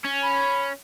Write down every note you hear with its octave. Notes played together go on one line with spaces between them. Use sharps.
C#4
B5